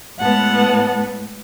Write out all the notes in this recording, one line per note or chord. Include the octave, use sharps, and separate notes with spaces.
A2 G#3 B3 F#5 A5